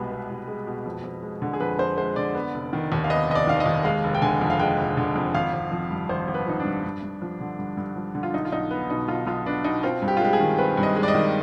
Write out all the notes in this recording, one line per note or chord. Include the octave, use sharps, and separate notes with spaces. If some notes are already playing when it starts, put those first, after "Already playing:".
Already playing: C2 B2 G#3 B3 G4 G#4 B4
B3
C2
G#3
B2
F2
F2
G#3
D3
G#4
F2 B4
F2 C5
G#3 C5
D3 D5
B3
F1
D#3
D#2
F5
B3 D#5
F1 D#5
D5
D#3 F5
D#5
D#2
G#3 F5
F1
G5
D3 G#5
F2
F5
G#3 G5
F1
D3
F2
G#1 F5
G#1
F3
G2
G#1 C5
G#1
B4
F3 D#4
D4
G2
G2
G2
F3
D3
G2
G2
F3
D3
F4
B1 D#4
F4
B1 D#4
B3
B2 D#4
B1 F4
B1 F4
B3 D4
B2 D#4
C4 F4
G2
G4
F4
G#3 G4
G#4
D#3
C4 B4
G2
D#5
G#3
D5
D#5
D#3